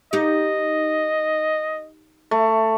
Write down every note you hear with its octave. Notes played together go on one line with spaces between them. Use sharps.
D#4 G4 D#5
A3